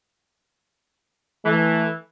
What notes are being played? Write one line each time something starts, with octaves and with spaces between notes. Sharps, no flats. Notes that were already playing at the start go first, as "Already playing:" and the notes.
E3 A3